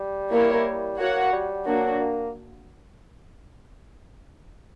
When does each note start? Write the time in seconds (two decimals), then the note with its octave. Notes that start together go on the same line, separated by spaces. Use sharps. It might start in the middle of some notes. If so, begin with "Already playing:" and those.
Already playing: G3
0.32 A#3 E4 A#4 C#5
0.99 A#3 F#4 C#5 F#5
1.33 G3
1.66 F#3 A#3 D4 F#4
2.00 A#3